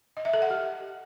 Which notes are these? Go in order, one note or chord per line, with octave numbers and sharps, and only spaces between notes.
D#5
E5
A4
F#5
G4